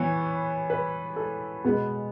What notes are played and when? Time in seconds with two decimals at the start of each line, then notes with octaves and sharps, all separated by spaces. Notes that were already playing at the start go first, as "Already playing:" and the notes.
Already playing: E3 B3 C#5
0.70 B4
1.16 A4
1.64 B2 G#3 B3